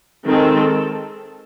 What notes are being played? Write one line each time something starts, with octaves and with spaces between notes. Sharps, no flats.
D#3 G#3 C4 A4